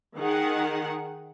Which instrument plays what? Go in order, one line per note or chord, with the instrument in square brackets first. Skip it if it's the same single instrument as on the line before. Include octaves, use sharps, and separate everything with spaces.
[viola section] D#3 G#4 F#5